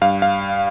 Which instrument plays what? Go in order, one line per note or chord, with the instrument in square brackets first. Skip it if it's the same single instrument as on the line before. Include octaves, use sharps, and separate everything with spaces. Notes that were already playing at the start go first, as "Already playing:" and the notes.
[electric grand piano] G2 F5
F5